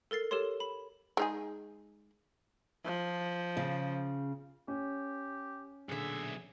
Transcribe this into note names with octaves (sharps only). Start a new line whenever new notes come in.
A4 A#4 A6 C7
G4 A4 A#4 C#5 C6
B5
G#3 D#4 G#4
F3
C#3
C#4 G4
B1 A#2 D3 G#4 E5